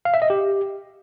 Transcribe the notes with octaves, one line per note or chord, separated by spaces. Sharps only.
F5
E5
D#5
G4